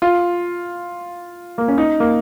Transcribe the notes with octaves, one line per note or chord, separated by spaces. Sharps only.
F4
A#3
C#4
D#4
A#3